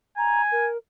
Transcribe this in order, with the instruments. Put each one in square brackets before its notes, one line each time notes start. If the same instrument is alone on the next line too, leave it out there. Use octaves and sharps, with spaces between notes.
[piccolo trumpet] G#5 [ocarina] A#5
[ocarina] A#4